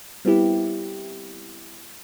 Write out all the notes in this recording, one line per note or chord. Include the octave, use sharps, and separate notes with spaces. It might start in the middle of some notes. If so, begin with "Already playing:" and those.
G3 B3 C4 E4 G4